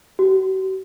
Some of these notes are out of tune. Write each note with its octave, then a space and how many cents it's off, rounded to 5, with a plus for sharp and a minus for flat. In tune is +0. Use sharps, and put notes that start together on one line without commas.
F#4 +45